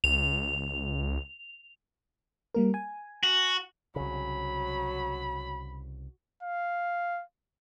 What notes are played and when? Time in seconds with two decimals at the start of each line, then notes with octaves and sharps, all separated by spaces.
0.04 C#2 F7
2.55 G3 A#3 A#4
2.74 G#5
3.23 F#4
3.96 C2 C#3 F#3 B5
6.43 F5